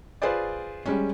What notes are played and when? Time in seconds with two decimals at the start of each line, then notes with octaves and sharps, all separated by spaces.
0.22 F4 G#4 B4 C5 D5
0.86 G3 G#3 C#4